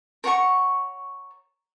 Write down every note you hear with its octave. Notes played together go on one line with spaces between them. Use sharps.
A#4 C#5 F#5 C#6